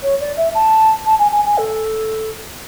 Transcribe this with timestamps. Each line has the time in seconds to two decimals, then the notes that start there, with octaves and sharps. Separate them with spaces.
0.03 C#5
0.20 D5
0.37 E5
0.54 A5
1.06 A5
1.19 G#5
1.31 G#5
1.45 G#5
1.58 A4